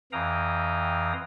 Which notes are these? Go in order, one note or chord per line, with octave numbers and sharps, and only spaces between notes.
F2 E3 F5 G5 A#5 D#6